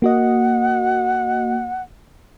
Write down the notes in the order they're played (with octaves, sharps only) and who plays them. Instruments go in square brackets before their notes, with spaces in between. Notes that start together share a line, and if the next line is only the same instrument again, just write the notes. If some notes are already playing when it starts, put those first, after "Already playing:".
[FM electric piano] A#3 F#4 D#5 [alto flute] F#5